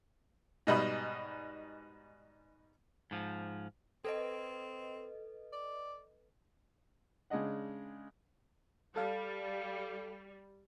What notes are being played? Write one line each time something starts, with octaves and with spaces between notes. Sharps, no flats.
G#2 B2 G3 B5 D#6
G#2 F3
C4 A4 B4 D#5
D5
C#3 G#3 D4 D#5 F#5
G3 A4 F5